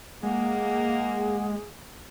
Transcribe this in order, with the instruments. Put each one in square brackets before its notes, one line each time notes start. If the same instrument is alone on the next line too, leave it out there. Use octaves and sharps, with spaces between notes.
[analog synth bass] G#3 [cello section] A#3 [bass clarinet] G#4 [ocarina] F#5